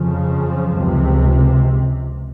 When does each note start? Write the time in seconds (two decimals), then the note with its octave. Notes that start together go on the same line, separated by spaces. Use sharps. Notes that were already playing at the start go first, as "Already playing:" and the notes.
Already playing: F2 C#3 F3
0.74 C#2 C3